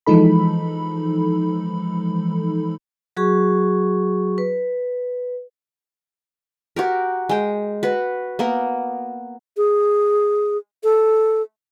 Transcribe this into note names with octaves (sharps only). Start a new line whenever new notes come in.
E3 F3 G#3 D#4 A4 B5
F#3 F#4 G#4 C#6
B4
F#4 G4 A#4
G#3 G5
F#4 B4
A#3 B3 A#4
G#4
A4